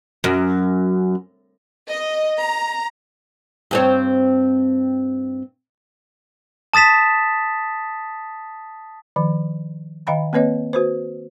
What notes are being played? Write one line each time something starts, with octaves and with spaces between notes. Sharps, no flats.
F#2
D#5
A#5
G2 C4 C#5
A5 D#6 A6 B6 E7
D#3 F3
D#3 D#5 F5 G5 A#5 B5
A#3 C4 B4 C#5 D#5
F#4 B4 C5